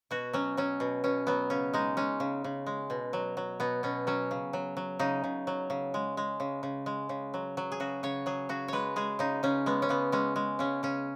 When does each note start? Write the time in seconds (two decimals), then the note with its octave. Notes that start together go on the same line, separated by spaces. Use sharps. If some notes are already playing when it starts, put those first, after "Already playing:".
0.11 B2 F#4
0.33 F#3 C#4
0.57 F#3 C#4
0.80 B2
1.04 B2 C#4
1.27 F#3 B3
1.50 C#3 C#4
1.73 G#3 D#4
1.97 G#3 C#4
2.20 C#3
2.44 C#3
2.67 G#3
2.90 B2
3.13 F#3
3.37 F#3
3.60 B2 B3
3.83 B2 C#4
4.07 F#3 C#4
4.31 C#3
4.53 F#3
4.77 F#3
4.99 C#3 D#4
5.24 C#3
5.47 F#3
5.70 C#3
5.94 G#3
6.17 G#3
6.40 C#3
6.63 C#3
6.86 G#3
7.09 C#3
7.34 F#3
7.57 F#3
7.72 G#4
7.80 C#3 F#4
8.03 C#3 C#5
8.26 F#3 G#4
8.49 C#3 F#4
8.68 G#3 B4 C#5
8.96 G#3 G#4
9.19 C#3 D#4
9.43 C#3 C#4
9.66 G#3 B3
9.82 C#4
9.89 C#3 B3
10.12 G#3 C#4
10.36 G#3
10.59 C#3 C#4
10.83 C#3 C#4